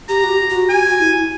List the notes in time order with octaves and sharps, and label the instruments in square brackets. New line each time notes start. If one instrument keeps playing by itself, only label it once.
[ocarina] G4 [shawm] A#5
[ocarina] F#4
G4
F#4
[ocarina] G4 [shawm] G#5
[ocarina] F#4
E4